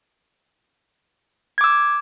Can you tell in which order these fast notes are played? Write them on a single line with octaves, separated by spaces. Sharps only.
G#6 D6 E6